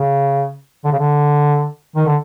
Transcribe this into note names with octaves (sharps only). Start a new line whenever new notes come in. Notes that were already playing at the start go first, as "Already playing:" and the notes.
Already playing: C#3
D3
C#3
D3
D#3
D3